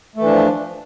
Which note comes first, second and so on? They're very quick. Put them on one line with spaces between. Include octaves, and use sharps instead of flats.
A3 E3 D4 F3